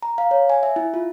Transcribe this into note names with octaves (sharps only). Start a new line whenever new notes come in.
A#5
F5
C#5
G#5
E5
E4
F4